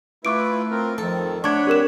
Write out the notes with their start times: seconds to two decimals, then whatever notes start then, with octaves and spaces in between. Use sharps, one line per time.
0.25 A3 E4 F4 B4 C#6 D6 D7
0.71 C4 F4 A#4
0.98 F2 D#3 F3 A4
1.44 A3 D4 C#5 F#5 B5 C#6 G#6
1.67 C4 G4 A#4 E7